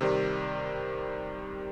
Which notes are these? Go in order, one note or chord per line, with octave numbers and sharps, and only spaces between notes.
C3 D#3 G3